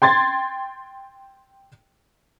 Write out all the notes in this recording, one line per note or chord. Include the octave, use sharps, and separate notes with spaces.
G5 C6 G#6 A6